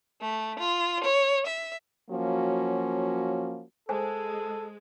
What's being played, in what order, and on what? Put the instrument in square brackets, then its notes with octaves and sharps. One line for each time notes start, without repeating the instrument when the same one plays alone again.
[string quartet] A3
F4
C#5
E5
[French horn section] F3 F#3 A#3 C#4 F#4
[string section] G#3 [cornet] A4 [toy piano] C5 G#5 A5